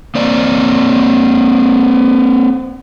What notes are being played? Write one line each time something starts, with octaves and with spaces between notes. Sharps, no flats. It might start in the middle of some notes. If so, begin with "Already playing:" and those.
A#3 C4 D5